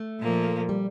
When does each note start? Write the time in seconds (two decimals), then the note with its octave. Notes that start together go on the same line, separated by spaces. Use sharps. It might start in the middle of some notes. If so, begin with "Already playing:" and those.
Already playing: A3
0.20 A#2 F3 A#3
0.69 G3